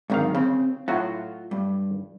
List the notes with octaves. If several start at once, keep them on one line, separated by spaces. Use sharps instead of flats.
G#1 G#2 D3 D#3 F#3 F5
C#3 C4
A2 F#3 F4 F#4
G2